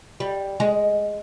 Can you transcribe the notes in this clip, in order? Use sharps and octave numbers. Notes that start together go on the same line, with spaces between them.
G3
G#3